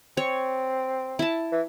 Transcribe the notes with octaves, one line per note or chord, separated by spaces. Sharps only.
C4 C#5
E4 A5
E3